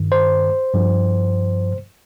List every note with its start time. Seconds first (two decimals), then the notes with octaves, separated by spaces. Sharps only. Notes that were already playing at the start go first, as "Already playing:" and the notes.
Already playing: G2 D#3
0.12 C5
0.73 G2 F3